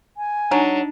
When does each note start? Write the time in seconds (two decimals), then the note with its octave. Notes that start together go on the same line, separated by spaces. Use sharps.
0.17 G#5
0.51 F#3 D4 D#4